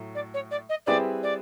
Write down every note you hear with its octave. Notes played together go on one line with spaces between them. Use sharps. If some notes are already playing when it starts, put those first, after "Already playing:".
Already playing: A2 F#3 A3
D5
C#5
D5
D#5
G3 C4 E4 G#4 B4 D5
D5